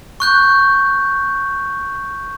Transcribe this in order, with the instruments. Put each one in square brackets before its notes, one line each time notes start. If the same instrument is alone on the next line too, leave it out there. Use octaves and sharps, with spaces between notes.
[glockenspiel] C#6 F#6 G6